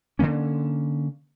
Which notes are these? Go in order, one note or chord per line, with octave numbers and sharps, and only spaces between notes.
D3 D#3 A#3 C#4